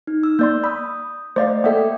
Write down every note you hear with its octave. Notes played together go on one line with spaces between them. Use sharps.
D#4
E6
A#3 D5 C6 G6
B5 D#6 E6
A3 C5 D5 D#5 F5
A#3 A4 D5 E5 F#5 G5